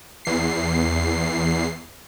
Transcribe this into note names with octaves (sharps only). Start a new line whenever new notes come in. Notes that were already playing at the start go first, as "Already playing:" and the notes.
E2 C7